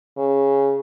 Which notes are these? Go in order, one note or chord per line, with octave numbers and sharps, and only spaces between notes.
C#3